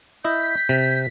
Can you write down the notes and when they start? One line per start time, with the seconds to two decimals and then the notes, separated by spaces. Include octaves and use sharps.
0.24 E4 D#5 G6 B6
0.69 C3